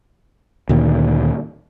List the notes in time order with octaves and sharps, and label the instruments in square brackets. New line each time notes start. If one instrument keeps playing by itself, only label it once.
[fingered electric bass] D2 A#2 D#3